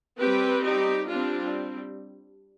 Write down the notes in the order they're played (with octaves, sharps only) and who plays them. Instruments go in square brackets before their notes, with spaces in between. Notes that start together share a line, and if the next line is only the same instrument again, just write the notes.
[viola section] G3 C4 G4 B4
D#4 G4
G3 C4 D4 F4